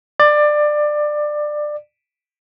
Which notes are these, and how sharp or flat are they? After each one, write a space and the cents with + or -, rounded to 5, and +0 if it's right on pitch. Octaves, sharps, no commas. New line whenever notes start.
D5 +20